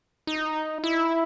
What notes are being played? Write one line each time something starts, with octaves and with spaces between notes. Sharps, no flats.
D#4
E4